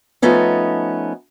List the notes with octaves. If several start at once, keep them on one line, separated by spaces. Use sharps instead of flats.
F3 A3 B3 C#4 D#4